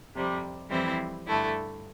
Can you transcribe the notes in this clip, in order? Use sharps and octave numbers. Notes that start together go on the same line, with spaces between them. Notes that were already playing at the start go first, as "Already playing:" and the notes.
F2 C3 G3
F2 E3 G3 C4 E4
G2 D3 A3 E4